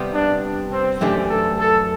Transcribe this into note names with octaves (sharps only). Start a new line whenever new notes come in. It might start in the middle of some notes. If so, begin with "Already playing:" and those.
Already playing: C3 G3 B3
D4
C4
F#2 E3 A3 D4 G4
A4
A4